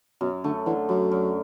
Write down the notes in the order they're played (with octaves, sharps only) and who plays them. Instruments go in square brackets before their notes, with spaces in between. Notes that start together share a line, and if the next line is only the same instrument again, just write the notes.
[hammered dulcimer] F#2 [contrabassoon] B2
[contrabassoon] D3 [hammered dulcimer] A3
[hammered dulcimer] D3 [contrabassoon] E3
[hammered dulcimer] F#2 [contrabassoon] F#3
[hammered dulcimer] F#2